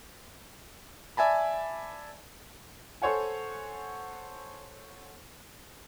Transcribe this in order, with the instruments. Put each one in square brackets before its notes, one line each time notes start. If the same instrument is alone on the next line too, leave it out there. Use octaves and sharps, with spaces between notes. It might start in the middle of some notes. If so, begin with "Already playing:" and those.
[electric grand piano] D5 E5 G#5 A5 B5
[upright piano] A4 C5 C#5 F#5 G#5